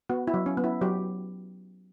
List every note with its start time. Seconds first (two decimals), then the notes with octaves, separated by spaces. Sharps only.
0.09 B3 F#4
0.27 E4
0.34 F#3
0.46 C#4
0.57 B3
0.64 E4
0.81 F#3 G4